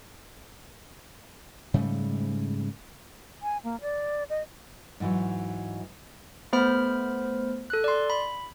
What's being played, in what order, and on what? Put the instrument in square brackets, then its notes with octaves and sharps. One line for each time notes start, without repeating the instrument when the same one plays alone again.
[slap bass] G#2 C#3 G3 A3
[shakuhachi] G#5
A#3
D5
D#5
[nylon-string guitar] G#2 E3 F#3
[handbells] A3 B3 C5 B5 F6
A4 F#6
D5 C6
B5